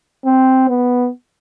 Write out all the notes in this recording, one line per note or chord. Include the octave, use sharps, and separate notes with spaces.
C4
B3